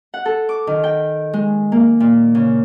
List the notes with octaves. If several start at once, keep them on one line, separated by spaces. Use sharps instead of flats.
F#5
A4
D6
D#3
G5
G#3
A#3
A#2
C#3